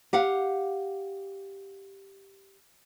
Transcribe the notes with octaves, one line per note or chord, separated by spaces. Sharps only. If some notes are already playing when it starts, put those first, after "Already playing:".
G4 F5 F#5